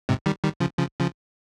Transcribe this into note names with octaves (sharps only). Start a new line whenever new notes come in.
G#2 C3
D#3 G3
D#3 G3
C#3 F3
C#3 F3
C#3 F3